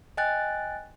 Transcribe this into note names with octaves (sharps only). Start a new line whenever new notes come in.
D#5 G5 G#5 F#6 A6